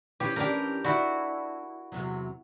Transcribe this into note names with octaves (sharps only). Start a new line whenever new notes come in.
E3 C#4 G4
E3 C#4 D4 G4 A#4
D4 E4 F#4
E2 C3 F#3